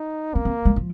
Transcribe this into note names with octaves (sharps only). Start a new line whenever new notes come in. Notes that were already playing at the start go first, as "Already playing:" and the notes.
Already playing: D#4
A#3 C4
C4
G#3
F3